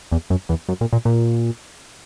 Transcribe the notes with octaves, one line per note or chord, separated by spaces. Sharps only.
E2
F#2
E2
F#2
A#2
A#2
A#2